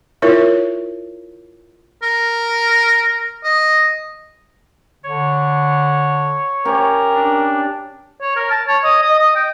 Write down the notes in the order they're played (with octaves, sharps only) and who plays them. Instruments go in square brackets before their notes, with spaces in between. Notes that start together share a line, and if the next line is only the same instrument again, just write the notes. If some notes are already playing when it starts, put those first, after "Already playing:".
[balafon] E4 F4 A#4 C#5 E5
[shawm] A#4
D#5
[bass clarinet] D3 [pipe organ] C#5
[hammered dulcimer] C#4 G4 [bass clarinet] A#4
[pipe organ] D4
[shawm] C#5
A#4
A5
C#5
D#5
D#5
D#5
G5